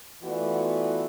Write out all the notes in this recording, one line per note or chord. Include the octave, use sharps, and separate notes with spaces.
E3 A3 B3 F4 F#4 D5